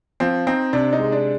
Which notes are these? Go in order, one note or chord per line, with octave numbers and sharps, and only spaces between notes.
F3 C4
C4 D#4
C3 D4
D#4
G#3
D4